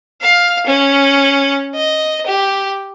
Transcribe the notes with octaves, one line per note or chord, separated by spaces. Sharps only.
F5
C#4
D#5
G4